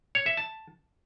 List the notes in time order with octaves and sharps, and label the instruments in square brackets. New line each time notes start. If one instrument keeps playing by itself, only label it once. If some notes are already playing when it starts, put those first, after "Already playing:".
[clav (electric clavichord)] C#5
E5
A5